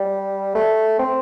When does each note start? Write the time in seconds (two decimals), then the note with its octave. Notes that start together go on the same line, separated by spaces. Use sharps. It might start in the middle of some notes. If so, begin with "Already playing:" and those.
Already playing: G3
0.55 A3
0.99 C4